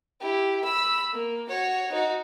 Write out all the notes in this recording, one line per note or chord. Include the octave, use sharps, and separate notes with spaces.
E4 G4
B5 E6
A#3
F#4 C#5
D#4 F#4